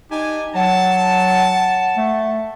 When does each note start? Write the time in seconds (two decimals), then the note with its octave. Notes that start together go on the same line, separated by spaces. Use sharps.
0.11 D4 D#4 G4 G#5
0.55 F#3 F#5 A5
1.97 A3